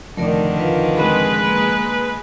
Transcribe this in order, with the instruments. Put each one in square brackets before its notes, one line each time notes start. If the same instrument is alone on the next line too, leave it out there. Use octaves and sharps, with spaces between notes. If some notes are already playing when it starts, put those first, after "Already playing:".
[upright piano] F1 [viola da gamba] D3 D#3 [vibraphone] A3 A#4 D5
[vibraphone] F4 B4 F5
[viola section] G#3 B4 [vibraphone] C4 B5
[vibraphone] A#3